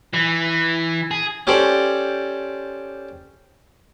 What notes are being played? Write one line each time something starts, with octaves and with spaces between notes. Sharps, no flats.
E3
G#4
C#4 G4 A4 C5 D5